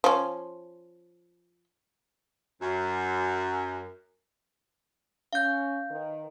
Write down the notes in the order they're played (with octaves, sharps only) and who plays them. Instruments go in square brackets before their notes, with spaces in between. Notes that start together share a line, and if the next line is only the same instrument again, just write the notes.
[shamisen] F3 C#4
[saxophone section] F#2
[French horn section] C#4 [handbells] F5 G6
[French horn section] D#3 B4